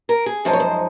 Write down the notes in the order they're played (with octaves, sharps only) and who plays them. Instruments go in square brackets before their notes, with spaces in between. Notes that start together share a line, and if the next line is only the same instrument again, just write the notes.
[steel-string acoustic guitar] A#4
G#4
F#2 F3 G#3 D#4 C5
C#5
C5